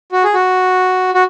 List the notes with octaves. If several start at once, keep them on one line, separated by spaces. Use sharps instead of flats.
F#4
G#4
F#4
F#4